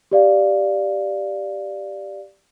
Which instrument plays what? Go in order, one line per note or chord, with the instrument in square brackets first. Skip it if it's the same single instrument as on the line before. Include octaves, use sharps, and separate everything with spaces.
[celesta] G4 D5 F5